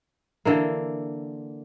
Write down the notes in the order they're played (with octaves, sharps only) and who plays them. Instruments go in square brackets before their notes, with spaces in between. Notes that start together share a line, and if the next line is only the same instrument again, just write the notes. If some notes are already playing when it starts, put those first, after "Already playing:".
[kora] D3 E3 A#3